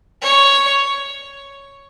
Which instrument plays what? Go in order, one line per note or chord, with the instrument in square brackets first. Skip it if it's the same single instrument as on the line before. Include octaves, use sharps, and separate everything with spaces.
[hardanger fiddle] C#5